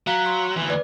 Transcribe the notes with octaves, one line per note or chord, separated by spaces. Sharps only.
F#3 F5 A#5 B6
C6
D2 E3
B4 D5